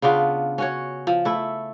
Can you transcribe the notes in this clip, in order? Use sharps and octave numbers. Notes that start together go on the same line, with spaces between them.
C#3 B3 D4 F4
C#4 F#4 C#5
F3
A3 E4